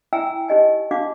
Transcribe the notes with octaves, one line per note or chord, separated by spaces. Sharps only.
E4 E5 G5 G#5 A#5 E6
D#4 G4 D#5 G#5
D4 D#4 F#4 F5 D6